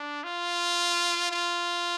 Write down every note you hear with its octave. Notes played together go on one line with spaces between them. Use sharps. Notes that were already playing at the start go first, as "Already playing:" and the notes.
Already playing: D4
F4
F4